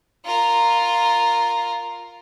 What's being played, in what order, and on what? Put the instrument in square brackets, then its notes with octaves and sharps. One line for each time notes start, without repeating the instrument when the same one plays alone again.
[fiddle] F4 A#4